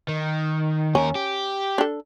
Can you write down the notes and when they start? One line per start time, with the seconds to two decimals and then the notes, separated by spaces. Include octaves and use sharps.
0.08 D#3
0.95 D#2 C#4 A#4
1.15 G4
1.78 D4 A4